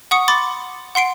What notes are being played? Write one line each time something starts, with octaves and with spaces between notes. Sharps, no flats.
F#5 C#6 D#6 C#7
B5 C6 D6 A6
F#5 C6 C7 D7